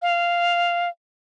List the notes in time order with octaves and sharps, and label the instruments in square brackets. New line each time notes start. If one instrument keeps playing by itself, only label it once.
[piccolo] F5